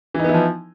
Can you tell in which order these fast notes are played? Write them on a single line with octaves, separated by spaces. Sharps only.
E3 D#4 B3 E4 F3